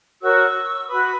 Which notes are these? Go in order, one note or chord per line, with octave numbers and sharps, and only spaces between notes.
F#4 A#4 C#5 C#6 E6
F#4 B4 B5 D#6